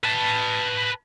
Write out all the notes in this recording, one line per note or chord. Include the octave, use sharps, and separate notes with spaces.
B4 A5